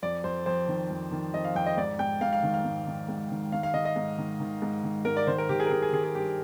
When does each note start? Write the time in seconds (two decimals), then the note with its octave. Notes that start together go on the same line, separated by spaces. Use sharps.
0.03 F2 D5
0.24 F2 C5
0.46 F2 C5
0.68 D#3
0.90 F2
1.12 D#3
1.34 F2 D#5
1.44 F5
1.55 F2 G5
1.66 D#5
1.77 G#2 D5
1.99 G#2 G5
2.21 G#2 F5
2.33 F5
2.43 D#3
2.54 F5
2.65 G#2
2.87 D#3
3.09 G#2
3.31 D#3
3.52 D#3 F5
3.63 F5
3.74 D#3 D#5
3.85 D#5
3.96 G#2
4.18 D#3
4.40 D#3
4.62 G#2
4.84 D#3
5.05 G#2 A#4
5.17 D5
5.27 D#3 C5
5.38 A#4
5.49 D#3 G4
5.60 G#4
5.66 A#4
5.71 D#3 G#4
5.82 G#4
5.93 D#3 G#4
6.04 G#4
6.15 G2 G4